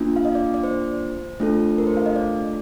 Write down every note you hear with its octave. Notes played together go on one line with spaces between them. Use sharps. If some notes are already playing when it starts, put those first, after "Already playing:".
Already playing: A#3 D4 F4
F5
D#5
D5
D5
C5
A3 D4 F4 A4
A#4
C5
F5
D#5
D5